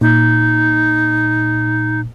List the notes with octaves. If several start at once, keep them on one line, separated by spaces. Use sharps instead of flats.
A#2 D#4